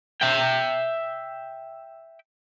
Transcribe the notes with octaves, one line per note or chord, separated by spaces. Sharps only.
E5 G5